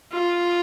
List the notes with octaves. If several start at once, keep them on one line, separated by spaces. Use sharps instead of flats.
F4